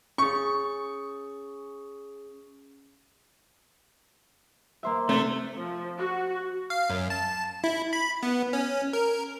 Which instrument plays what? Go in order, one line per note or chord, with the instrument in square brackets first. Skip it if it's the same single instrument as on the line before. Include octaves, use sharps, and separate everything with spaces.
[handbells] C#4 G#4 [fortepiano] C#6
[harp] A#3 C5 E5
[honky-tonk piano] C3 [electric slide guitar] A3 [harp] C5 G#6 A6
[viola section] F3
F#4
[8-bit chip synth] F5
F#2
A5
E4
B5
B3
C#4
A#4